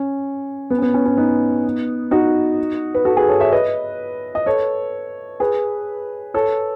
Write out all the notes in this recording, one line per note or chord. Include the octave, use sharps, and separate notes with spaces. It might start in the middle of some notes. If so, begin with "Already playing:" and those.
Already playing: C#4
B3
C#4
B3
C#4
C#4
B3 D#4
D#4 F#4
B4
F#4 A4
G#4 B4
A4 C#5
C#5 E5
B4 D#5
D#5
A4 C#5
G#4 B4
A4 C#5